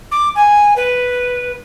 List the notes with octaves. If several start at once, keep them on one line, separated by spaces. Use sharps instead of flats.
D6
G#5
B4